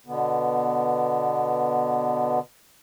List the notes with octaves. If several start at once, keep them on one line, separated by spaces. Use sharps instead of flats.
B2 D3 B3